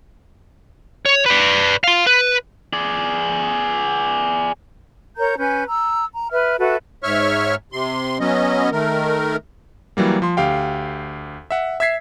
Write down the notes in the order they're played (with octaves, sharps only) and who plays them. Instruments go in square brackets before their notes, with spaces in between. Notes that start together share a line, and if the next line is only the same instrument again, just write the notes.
[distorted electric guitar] C#5
B4 D5
F5 C6
B4
[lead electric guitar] G#4 D5
[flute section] A#4 C#5 A#5 G6
C#4 B4 G#5 G6
A#5 E6
A#5
B4 E5 F6
F#4 A4 B4 E5
[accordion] G#2 C#5 E5 C#6 F6
C3 C6
F#3 B3 C#4 D#5
D#3 A3 A#4
[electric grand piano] E3 F#3 G3 A#3
F3 C6
D2 G4 F5 G5
E5 F#5
E5 E6 G#6 B6 C7